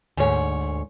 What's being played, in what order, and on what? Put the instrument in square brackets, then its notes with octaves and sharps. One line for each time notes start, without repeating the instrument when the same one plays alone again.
[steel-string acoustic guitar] D2 G#2 C#5